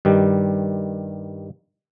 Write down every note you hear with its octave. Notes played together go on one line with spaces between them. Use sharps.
G2 D#3 G3